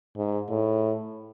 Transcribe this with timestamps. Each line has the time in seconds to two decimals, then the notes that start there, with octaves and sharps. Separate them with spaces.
0.17 G#2
0.49 A2